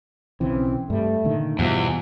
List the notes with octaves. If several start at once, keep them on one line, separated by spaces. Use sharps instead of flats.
B1 C#3 E3 C4
G2 G3 A3
A#2 D3 D#3
E2 G2 B2 F3 G3